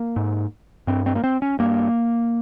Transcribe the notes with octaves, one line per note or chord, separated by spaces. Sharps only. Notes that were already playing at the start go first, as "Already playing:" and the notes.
Already playing: A#3
G#2
G2 C4
C4
A#3
C4
C#4
G2 A#3